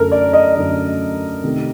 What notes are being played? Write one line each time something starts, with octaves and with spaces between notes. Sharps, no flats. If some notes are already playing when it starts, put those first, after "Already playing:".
Already playing: F#2 D3 A3 A4 A#4
D5
D#5
F#2 D3 A3
C3 D#3 A3